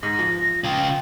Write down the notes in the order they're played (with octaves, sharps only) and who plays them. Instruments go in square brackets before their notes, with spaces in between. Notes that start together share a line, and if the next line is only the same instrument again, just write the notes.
[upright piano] G#2 [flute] A#6
[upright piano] F3
[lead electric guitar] C#3 F4 [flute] G5